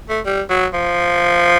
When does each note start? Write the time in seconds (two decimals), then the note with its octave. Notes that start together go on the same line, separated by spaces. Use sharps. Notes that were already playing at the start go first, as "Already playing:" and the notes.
0.09 A3
0.25 G3
0.50 F#3
0.73 F3